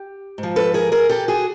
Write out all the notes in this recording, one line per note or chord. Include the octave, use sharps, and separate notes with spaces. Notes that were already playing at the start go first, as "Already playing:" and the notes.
Already playing: G4
G#2
F3
A4 B4
G#4 A#4
G#4 A#4
G4 A4
F#4 G#4